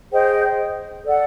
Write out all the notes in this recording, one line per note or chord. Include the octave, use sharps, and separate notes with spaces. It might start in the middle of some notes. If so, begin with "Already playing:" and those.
G#4 C5 D#5 G5
A4 D5 F#5